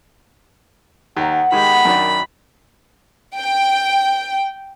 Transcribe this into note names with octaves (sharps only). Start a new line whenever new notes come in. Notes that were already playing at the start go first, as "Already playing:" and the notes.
D#2 F#5 A#5
D#3 G#3 G4 B5
F#2 D#3 D4
G5